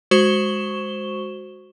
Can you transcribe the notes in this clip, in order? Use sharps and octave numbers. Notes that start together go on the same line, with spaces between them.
G#3 F#4 C5 C#6 E7 G7